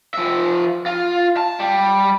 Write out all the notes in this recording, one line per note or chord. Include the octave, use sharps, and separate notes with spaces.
F3 E5
F4
A5
G3